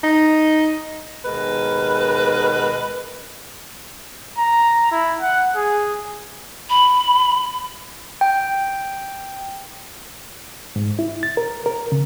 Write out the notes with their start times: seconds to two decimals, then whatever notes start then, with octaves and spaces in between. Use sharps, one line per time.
0.04 D#4
1.25 D#2 B2 G#3 A#4 B4
4.38 A#5
4.91 E4
5.21 F#5
5.56 G#4
6.69 B5
8.21 G5
10.76 G#2
10.99 E4
11.23 A6
11.37 A#4
11.66 A#4
11.92 C#3